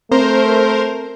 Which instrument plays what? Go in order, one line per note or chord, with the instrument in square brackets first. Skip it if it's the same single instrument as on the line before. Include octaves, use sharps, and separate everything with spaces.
[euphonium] A3 [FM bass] C4 [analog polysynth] A#4 C5